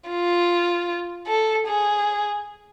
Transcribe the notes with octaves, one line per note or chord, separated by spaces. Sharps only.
F4
A4
G#4